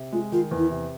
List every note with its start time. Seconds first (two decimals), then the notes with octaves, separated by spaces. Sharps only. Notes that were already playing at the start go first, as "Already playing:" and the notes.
Already playing: C3
0.12 G#3 F4
0.32 D#3 F4
0.51 E2
0.58 E4
0.70 C3